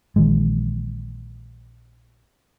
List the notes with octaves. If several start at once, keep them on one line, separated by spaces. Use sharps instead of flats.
A#1 D#3 E3 G#3